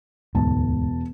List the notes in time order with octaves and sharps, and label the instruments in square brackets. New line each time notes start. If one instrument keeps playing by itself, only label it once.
[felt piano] E1 A5 [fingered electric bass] D2 G#2